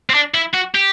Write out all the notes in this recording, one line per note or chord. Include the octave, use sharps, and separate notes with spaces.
C4
D4
E4
F#4
G4